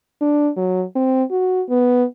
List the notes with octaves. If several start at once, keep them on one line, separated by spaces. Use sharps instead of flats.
D4
F#3
C4
F#4
B3